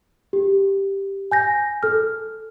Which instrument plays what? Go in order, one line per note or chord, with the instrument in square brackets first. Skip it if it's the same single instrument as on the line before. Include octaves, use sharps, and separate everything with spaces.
[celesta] G4
G#5 G6 A#6
A4 F6